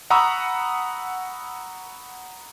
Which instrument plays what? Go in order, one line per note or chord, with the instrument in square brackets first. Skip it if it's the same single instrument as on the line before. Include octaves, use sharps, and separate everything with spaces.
[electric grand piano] F#5 A#5 B5 C#6 D#6 E6